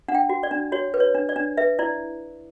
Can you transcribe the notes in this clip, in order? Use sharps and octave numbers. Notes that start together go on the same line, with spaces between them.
D4 F#5
G5
F#4
D5
D4
F#4 C#5
B4
C#5
D4
D5
D4
B4 E5
E4 D5